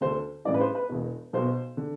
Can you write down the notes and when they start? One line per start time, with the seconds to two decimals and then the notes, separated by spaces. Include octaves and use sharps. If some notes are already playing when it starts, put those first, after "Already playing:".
0.01 D2 D3 C5
0.45 A1 G2 E3 D5
0.54 B4
0.60 C5
0.75 B4
0.89 E1 E2 B2
1.33 B1 B2 C5
1.77 D3